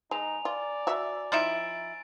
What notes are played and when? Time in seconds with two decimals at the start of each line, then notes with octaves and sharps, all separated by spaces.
0.11 G#3 D#4 G#5 A#5 F7
0.45 F4 D5
0.87 F#4 E5
1.32 F3 D#4 E4 A6 D7